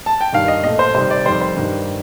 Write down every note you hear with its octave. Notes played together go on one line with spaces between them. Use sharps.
A5
G5
G2 D#3 G3 F5
D#5
A#2 A3 D#5
C5
C3 D#3 G3 C5
D5
F2 D#3 G3 C5
C5
G2 D#3 G3